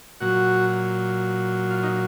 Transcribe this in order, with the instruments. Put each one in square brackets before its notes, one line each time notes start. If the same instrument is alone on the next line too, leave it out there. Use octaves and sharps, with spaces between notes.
[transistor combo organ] A#2 F#3 F#4
F4
D#4